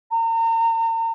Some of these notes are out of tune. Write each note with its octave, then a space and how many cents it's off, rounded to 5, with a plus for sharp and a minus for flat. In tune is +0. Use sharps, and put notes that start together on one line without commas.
A#5 -40